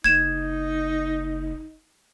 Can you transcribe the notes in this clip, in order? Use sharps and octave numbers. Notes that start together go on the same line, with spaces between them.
F#1 D#4 G#6 E7